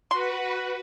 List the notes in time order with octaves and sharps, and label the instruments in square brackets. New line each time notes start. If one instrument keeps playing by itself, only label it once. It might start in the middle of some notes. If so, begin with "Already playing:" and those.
[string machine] F#4 B4 [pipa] C6